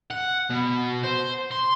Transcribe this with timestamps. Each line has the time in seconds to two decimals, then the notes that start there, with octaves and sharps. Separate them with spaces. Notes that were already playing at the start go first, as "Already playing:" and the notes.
0.11 F#5
0.50 B2
1.03 C5
1.51 C6